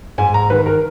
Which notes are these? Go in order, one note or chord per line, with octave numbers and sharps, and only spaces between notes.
G#2 G#5
A#5
D#3 B4
A#4